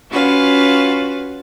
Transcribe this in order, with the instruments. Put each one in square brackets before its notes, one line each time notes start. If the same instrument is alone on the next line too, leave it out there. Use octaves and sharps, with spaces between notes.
[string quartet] C#4 F4 F#4 B4 F5